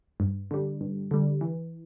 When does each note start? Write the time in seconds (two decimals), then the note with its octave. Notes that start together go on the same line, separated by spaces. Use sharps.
0.20 G2
0.51 D3 G3
0.81 G2
1.11 D3 G3
1.41 E3